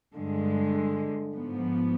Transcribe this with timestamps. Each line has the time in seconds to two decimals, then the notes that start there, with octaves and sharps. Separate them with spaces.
0.14 G2 D3 G#3
1.33 G#2 F3 B3